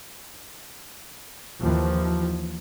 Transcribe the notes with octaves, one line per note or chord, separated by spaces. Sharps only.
D#2 E3 F3